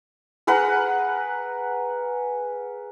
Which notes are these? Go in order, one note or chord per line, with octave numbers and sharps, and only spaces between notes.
G#4 A#4 B4 F#5